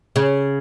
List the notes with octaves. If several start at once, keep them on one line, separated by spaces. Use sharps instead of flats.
C#3